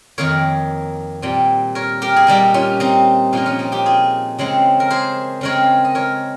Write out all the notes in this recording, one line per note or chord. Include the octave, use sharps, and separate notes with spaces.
F2 D#3 A#3 A#4 C#5
A#2 G3 C4
A#4 C#5
G4 A#4
G#4
A#2 G3 A#3 D#4 G4
C#4 F4
C4 D#4
A#2 F3 A#3 C#4 F4
C#4 F4
C4 D#4
D#4 G4
F4 G#4
C#3 G#3 C4
A#4
G#4 C5
C#3 G#3 C4 A#4 C#5
D#5
A#4 C#5